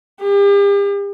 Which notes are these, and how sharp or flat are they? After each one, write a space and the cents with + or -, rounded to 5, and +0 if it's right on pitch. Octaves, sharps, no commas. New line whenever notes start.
G4 +40